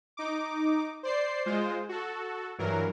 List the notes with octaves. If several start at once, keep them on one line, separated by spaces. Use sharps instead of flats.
D#4 D6
C5 D5 C7
G#3 F4 C5
F#4 A4
G2 E3 F#3 A#4